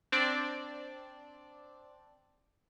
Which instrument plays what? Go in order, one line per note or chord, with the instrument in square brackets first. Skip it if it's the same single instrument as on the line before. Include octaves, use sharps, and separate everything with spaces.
[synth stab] C4 D4 D5